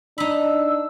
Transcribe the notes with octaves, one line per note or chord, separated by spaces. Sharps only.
D4 D#4 B5 E6